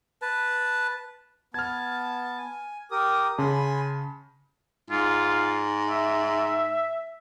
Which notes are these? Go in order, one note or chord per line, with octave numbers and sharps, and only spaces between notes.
B4 A5
B3 A5 F6 G#6
G#5
G4 A#4 D#6
C#3 G#5 A5 B5 C6
G#2 F4
E5